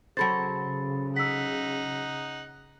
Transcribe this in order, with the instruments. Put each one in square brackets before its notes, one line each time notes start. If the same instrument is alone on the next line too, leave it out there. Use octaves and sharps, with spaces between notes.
[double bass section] C#3 [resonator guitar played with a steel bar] F#3 A4 C5 [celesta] B5 A6
[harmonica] D#4 F#5 [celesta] E6 B6